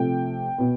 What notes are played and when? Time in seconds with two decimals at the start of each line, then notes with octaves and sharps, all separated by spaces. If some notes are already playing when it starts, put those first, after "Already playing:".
Already playing: C3 F3 A3 G5
0.58 B2 B3